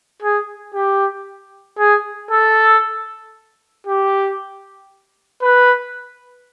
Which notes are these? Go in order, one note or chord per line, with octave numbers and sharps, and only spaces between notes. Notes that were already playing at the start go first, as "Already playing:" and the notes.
G#4
G4
G#4
A4
G4
B4